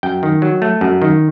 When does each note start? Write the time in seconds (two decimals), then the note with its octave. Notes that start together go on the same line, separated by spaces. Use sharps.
0.03 F#2 G5
0.23 D#3
0.42 F#3
0.62 A3
0.81 F#2
1.02 D#3